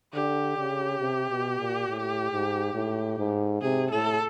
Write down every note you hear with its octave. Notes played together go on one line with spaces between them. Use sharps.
D3 G4
C#3
C3
B2
A#2
A2
G#2
A2
G#2
C3 G#4
A2 A4